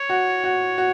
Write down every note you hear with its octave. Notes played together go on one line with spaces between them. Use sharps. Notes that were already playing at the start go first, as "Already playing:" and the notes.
Already playing: C#5
F#4
F#4
F#4